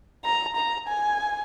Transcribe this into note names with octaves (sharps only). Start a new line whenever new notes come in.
A#5
A#5
G#5